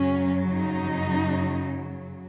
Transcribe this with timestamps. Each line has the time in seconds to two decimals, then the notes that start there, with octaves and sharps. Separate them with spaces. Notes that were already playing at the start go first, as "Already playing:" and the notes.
Already playing: F#2 C#3 F#3 C#4
0.52 D#4